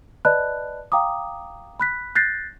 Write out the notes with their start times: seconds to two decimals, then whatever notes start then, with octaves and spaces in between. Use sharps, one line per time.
0.25 B4 D5 D#5 A5 B5 F#6
0.92 F5 G5 A#5 D6 D#6
1.80 B5 F#6 B6
2.15 F#6 G6 A6 A#6 C7